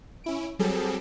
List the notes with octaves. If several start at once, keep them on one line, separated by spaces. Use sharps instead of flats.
C#4 E4 D7
F#3 G3 C4 G#4 A4